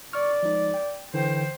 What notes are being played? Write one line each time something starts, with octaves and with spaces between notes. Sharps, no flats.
D5 C#6 F6
F3 G#3 D#4
G5
D3 E3 C5 G5